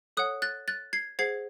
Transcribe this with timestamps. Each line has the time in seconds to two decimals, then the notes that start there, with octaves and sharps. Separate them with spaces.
0.17 A4 C#5 F#5 D#6 F#6
0.42 F#6 A6
0.68 F#6 A6
0.93 G#6 C7
1.19 G#4 C5 F#5 G#6 C7